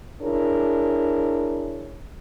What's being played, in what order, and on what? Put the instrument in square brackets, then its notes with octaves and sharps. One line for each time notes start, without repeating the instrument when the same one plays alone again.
[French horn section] D4 E4 G#4 A#4 C#5